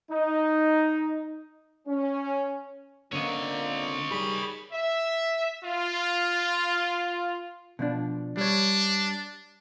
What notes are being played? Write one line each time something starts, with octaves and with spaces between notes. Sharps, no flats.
D#4
C#4
A#2 D3 A#3 C4 C#4 C#5 D#5
D#3 G3 G#4 B5
E5
F4
B2 F3 D4
G3 D4 C#5